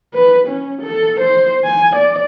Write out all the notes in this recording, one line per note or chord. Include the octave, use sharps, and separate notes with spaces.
B4
C#4
A4
C5
G#5
D5